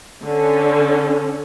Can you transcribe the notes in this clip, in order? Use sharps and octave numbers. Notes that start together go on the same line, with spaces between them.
D3 C#4